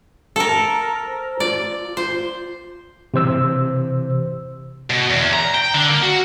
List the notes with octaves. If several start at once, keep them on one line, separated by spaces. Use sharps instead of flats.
A4 A#4
C5
F4 D5
C5
C3 E3 C5 E6
B2
E2
A#5
G5
D3
A#3
F#4